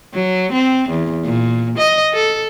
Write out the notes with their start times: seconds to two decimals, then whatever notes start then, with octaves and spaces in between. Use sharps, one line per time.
0.14 F#3
0.52 C4
0.89 E2
1.24 A#2
1.78 D#5
2.13 A4